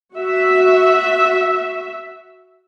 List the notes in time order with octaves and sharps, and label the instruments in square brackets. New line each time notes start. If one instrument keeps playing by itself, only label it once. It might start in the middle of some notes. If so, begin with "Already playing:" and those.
[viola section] F#4 E5